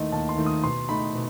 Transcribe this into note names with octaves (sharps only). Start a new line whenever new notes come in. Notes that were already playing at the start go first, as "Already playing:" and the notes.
Already playing: D#2 D#3 A3 D#5 C6
D#2 A5
C6
D#3 A3
D#6
B2 C6
A3 D#4 B5
B2